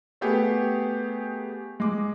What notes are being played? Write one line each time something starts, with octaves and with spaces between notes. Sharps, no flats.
A3 B3 G4 G#4
G#3 D6